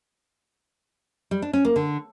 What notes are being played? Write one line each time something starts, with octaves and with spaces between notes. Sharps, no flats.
G3
D4
C#4
A#3
D3